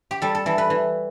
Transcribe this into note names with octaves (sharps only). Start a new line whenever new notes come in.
G4
G3 A4
A4
E3 A4
B4
E3